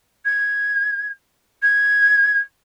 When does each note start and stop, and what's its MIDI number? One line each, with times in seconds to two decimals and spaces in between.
0.25 1.10 92
1.62 2.39 92